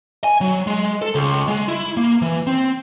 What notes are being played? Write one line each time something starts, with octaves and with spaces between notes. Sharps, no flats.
G#5
F#3
G#3
A4
C#2
G#3
E4
A#3
E3
C4